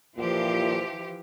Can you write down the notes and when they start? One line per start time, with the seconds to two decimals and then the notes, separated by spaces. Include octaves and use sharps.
0.17 A#2 E3 F3 G4